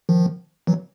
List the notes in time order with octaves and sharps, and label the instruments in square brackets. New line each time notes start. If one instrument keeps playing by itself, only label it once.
[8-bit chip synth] D#3 F3
E3 F#3